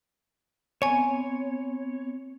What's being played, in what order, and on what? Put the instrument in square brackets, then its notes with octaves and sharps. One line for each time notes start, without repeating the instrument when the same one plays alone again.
[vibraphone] B3 C4 [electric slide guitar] C#5 [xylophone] G#5 C#6